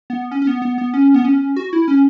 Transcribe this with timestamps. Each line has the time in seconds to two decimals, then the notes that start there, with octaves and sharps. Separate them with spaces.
0.10 B3
0.31 C#4
0.42 C#4
0.47 B3
0.62 B3
0.78 B3
0.94 C#4
1.14 B3
1.25 C#4
1.56 F#4
1.73 E4
1.88 C#4